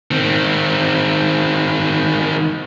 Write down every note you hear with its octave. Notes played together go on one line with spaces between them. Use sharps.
D#3 C4